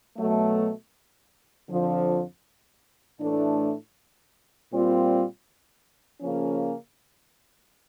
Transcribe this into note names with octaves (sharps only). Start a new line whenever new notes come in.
B2 F#3 A3
F2 D3 F3
A2 E3 A3 D4
A#2 G3 C4 F4
C#3 F3 A#3 C#4